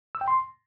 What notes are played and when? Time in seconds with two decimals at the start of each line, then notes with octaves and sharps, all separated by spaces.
0.15 E6
0.21 G5
0.28 C6